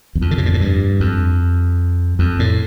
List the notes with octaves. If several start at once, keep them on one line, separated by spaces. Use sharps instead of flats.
E2
F2
D3
C3
A#2
A2
G2
F2
F2
A2